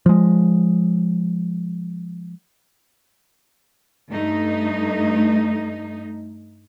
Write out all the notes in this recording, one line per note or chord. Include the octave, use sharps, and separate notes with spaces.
F3 G#3
G2 A3 D#4